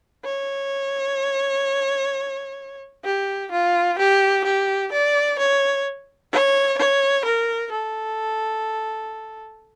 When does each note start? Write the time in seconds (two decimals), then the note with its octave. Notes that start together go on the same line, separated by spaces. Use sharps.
0.25 C#5
3.04 G4
3.51 F4
3.98 G4
4.45 G4
4.92 D5
5.39 C#5
6.32 C#5
6.78 C#5
7.25 A#4
7.72 A4